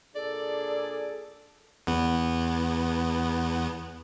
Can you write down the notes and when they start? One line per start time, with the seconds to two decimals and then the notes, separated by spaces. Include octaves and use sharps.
0.16 A#2 D4 G#4 A4 D5
1.87 E2 B3